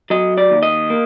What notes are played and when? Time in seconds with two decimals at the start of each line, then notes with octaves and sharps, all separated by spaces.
0.10 F#3 D#5
0.38 D5
0.51 D#2
0.63 D#5
0.90 A#3